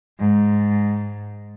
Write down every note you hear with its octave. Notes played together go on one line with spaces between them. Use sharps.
G#2